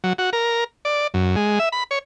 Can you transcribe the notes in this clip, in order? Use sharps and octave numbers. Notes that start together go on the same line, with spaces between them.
F#3
F#4
A#4
D5
F#2
G#3
E5
B5
C#5